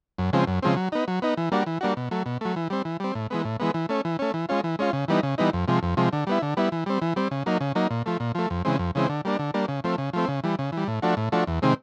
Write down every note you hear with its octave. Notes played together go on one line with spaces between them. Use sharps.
F#2
C#3 F3 G#3 C4
F#2
C#3 F3 G#3 C4
F#3
B3 D#4
F#3
B3 D#4
E3
G3 A#3 D4 F#4
E3
G3 A#3 D4 F#4
B2
F#3 A3
B2
F#3 A3
E3
G3 C4
E3
G3 C4
A2
E3 G#3 B3
A2
E3 G#3 B3
E3
A3 C#4
E3
A3 C#4
E3
G#3 C#4 F4
E3
G#3 C#4 F4
C#3
E3 G3 B3 D#4
C#3
E3 G3 B3 D#4
F2
C3 F3 G#3
F2
C3 F3 G#3
D3
G3 B3 E4
D3
G3 B3 E4
E3
G3 C4
E3
G3 C4
C#3
F#3 A#3 D#4
C#3
F#3 A#3 D#4
A#2
F3 A3
A#2
F3 A3
F2
C#3 E3 G#3 C4
F2
C#3 E3 G#3 C4
D3
G3 A#3 D4
D3
G3 A#3 D4
C#3
F3 A3 C4
C#3
F3 A3 C4
C#3
E3 G3
C#3
E3 G3
A2
F3 A3 D4 F#4
A2
F3 A3 D4 F#4
E2
C3 D#3 G#3 C4